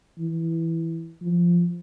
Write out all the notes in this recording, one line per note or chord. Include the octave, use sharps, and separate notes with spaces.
E3
F3